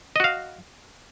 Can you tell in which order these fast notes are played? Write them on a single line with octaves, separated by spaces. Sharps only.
D#5 F#4 F5